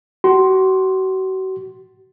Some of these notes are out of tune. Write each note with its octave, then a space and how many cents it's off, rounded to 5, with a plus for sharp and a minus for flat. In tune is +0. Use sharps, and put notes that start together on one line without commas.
F#4 +35 C6 +0